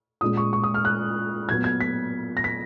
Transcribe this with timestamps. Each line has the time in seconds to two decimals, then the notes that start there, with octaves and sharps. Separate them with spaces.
0.21 A#2 G#3 C#4 D#6
0.37 C#6
0.53 C#6
0.64 D#6
0.74 F6
0.85 F#6
1.49 A#2 F#3 B3 G#6
1.64 G#6
1.80 B6
2.37 A#6
2.44 B6